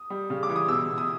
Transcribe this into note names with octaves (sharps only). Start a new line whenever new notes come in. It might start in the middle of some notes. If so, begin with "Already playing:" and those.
Already playing: D#6
G3
C#3
D6
E3
D#6
B2 E6
B2
D#6